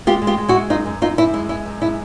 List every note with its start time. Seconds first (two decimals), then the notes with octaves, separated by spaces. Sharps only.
0.07 G#3 F4 G4
0.22 G#3
0.27 F4 G4
0.38 G#3
0.48 E4 F#4
0.55 G#3
0.70 F#2 D#4 F4
0.86 F#2
1.02 F#2 D#4 F4
1.18 F#2 E4
1.33 G#3 E4
1.49 G#3 E4
1.66 F#2
1.82 G#3 E4